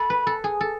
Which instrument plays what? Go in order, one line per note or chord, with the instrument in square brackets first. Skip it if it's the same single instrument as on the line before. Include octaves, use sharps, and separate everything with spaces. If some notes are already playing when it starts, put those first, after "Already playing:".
Already playing: [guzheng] A4 [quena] B5
[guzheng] B4
A4
G#4
A4